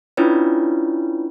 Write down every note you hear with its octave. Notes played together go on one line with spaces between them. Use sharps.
C#4 D4 E4 F4 B4 C#5